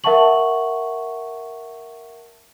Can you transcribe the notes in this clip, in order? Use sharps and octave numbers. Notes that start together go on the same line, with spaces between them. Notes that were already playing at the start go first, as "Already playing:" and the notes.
A#4 E5 F#5 A5 C#6 F#7